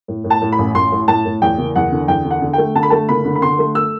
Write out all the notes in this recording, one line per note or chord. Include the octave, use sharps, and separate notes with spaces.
A2
A2
A5
A2
B5
A1
A1 C6
A2
A2 A5
A2
E2 G5
F#1
E2 F#5
D3
E2 G5
D3
F#5
D3
A3 G5
D3 A5
B5
A3 A5
F#1 B5
D3
B5
D3 C6
A3
E6